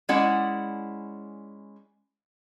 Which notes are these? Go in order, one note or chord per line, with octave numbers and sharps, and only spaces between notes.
G#3 C#4 E4 D5 F#5